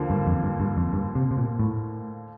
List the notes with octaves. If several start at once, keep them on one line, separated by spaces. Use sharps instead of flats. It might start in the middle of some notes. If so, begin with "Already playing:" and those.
Already playing: D#2 D3 F3 A#3
G2
F2
G2
G2
F2
G2
C3
C3
A#2
A2